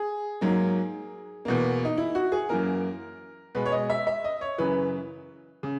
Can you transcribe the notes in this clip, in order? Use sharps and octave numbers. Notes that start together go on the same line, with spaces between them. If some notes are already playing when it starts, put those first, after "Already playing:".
Already playing: G#4
G#2 F#3 A#3
E2 B2 A#3
D#4
E4
F#4
G#4
F#2 E3 A#3 A#4
B2 G#3 B4
C#5
D#5
E5
E5
D#5
C#5
F#2 C#3 E3 B4
C#3